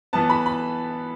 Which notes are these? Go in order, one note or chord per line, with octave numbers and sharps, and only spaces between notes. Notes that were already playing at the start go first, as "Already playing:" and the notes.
E3 B3 A5
B5
B5